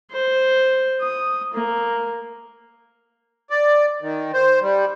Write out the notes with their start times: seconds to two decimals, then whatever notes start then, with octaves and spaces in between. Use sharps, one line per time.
0.11 C5
1.01 D#6
1.53 A#3
3.50 D5
4.02 D#3
4.34 C5
4.61 G3